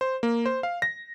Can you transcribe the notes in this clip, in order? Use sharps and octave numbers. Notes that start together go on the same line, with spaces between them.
C5
A#3
C5
F5
A#6